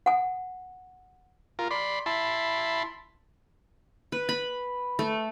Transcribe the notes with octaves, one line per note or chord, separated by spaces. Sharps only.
F#5 G#5
F4 A#4
D5 B5 C6
E4 A5 B5 C6
B4
B5
A3